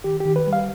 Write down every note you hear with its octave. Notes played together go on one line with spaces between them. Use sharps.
D#3 G4
G4
D#3
B4
G3
F5